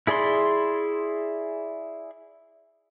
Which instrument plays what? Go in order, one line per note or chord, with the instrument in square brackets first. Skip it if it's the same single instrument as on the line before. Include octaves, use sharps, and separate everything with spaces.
[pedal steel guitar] E4 G#4 D5 B5 C6